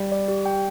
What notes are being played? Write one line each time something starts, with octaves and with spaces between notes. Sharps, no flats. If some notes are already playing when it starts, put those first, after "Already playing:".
Already playing: G3
D5
G4
G5